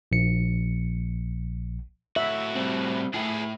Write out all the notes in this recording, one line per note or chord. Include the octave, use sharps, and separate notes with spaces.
A#1 C#7
A2 F#4 E5
G3 C4
A2 E4 G#4 B4